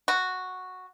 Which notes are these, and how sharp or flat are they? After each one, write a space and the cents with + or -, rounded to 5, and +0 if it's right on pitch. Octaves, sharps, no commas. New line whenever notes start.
F#4 -5